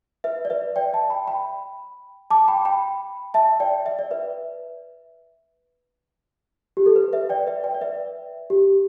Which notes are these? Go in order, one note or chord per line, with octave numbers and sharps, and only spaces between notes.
B4 E5
D5
B4 E5
D5 G5
E5 A5
G5 B5
G5 B5
A5 D6
G5 B5
G5 B5
E5 A5
D5 G5
E5
D5
B4 E5
G4
A4
B4
B4 E5
D5 G5
B4 E5
D5 G5
D5
B4 E5
G4